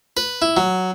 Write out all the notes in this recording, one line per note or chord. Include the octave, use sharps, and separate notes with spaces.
B4
E4
F#3